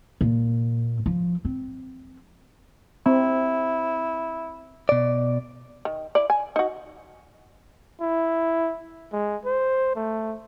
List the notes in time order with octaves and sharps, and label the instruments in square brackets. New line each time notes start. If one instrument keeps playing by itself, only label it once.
[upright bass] A#2
F3
C4
[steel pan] C4 [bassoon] E4
[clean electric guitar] B2 D5
[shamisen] D#3
E4 D5
G#5
D#4 F#4
[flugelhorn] E4
G#3
C5
A3